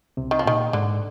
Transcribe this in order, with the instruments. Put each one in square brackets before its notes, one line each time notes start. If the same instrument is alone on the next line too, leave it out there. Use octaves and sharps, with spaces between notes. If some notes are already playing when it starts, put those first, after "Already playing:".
[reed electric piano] C2 C3
[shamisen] D#3
F3
[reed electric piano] A#2 [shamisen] D#3
[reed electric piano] G#2 [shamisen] D3